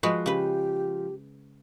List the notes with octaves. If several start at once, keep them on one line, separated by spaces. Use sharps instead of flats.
F3 G#3 F#4 B4
C#3 G4 B4